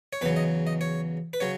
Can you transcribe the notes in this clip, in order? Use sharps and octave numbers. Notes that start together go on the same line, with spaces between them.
C#5
E2 C#3 F#3 B4
D#5
D#5
C#5
B4
C#3 F#3 C#5